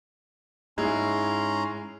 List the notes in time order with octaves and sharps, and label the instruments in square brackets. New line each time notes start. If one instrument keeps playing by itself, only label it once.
[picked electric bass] G#2 [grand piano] G#3 E4 [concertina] C#4 A#5 C6